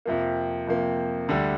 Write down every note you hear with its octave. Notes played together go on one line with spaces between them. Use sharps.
F2 C3 F3 A#3
F2 C3 F3 A#3
D2 D3 G3